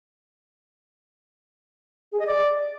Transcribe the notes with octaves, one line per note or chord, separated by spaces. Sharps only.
G#4
D#5
D5